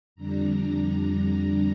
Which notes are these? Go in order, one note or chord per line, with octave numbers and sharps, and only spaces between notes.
F2 D3 G3 D4 A#5